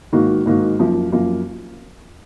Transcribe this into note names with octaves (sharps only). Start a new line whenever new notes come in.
G#2 D#3 A#3 D#4 F#4
G#2 D#3 A#3 D#4 F#4
F#2 F3 A#3
F#2 F3 A#3